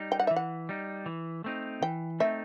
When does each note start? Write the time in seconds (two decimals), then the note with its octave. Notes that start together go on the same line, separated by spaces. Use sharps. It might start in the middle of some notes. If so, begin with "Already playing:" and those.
Already playing: G3 D#4
0.12 G5
0.20 F#5
0.27 E5
0.31 E3
0.36 F#5
0.69 G3 D#4
1.06 E3
1.44 A3 C4 D#4
1.82 E3 G5
2.20 A3 C4 D#4 E5